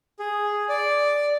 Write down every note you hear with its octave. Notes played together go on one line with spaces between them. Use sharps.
G#4
D5